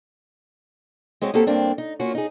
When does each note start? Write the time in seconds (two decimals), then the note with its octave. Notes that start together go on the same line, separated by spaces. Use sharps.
1.21 G#3 C4 C#4 F#4
1.34 A#3 C4 F#4 G4 A4
1.47 G2 A#3 C4 D4
1.78 D#4
2.00 A#3 C#4 F4 F#4
2.15 D#4 G#4